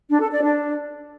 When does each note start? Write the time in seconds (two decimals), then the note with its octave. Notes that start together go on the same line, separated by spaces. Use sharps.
0.10 D4
0.21 A4
0.32 D5
0.43 D4